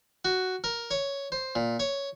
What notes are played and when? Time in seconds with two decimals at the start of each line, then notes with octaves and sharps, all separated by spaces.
0.25 F#4
0.64 A#4
0.91 C#5
1.32 C5
1.55 A#2
1.79 C#5